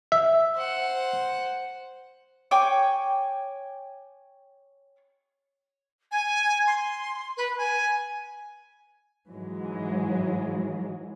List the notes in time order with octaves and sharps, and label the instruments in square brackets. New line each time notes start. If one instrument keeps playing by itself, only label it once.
[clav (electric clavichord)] E5
[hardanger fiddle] C5 F#5
[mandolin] C#5 G5 G#5 D6
[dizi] G#5
C6
B4
G#5
[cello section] G#2 E3 F#3 G#3